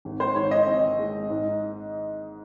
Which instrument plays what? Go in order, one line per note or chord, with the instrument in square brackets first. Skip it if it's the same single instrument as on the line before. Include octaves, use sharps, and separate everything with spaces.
[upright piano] G#1
C5
G#1 C#5
D#5
C4
G#3
G#2